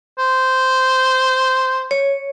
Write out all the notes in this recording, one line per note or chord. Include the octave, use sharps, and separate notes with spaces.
C5
C#5